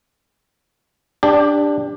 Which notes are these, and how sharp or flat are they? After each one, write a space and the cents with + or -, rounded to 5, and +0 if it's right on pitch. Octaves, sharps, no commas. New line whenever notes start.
D4 +0 G4 +25